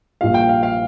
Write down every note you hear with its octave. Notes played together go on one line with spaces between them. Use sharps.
A#1 A#2 G3 F5
G5
F5
F5